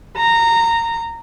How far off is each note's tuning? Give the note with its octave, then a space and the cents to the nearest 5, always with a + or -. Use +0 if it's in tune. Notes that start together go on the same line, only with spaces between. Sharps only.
A#5 -15